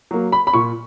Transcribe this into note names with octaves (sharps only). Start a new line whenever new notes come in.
F#3 A#3
B5
B5
A#2 C#6